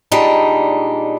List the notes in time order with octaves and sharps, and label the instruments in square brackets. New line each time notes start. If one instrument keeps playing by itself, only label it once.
[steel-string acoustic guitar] A#2 G3 G#3 D4 D#4